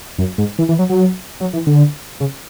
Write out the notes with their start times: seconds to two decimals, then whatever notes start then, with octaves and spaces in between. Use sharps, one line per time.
0.18 F#2
0.38 G#2
0.59 E3
0.69 E3
0.79 F#3
0.89 F#3
1.40 F#3
1.53 E3
1.67 D3
2.20 C#3